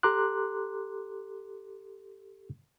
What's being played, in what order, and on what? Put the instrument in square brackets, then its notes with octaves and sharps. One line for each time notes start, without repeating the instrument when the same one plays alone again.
[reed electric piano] G4 A4 A#5 C6 D6 F#6